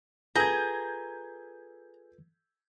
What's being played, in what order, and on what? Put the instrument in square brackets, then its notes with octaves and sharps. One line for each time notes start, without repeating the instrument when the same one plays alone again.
[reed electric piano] F4 A4 B4 [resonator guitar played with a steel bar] G#4 [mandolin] A#5 [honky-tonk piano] G6 G#6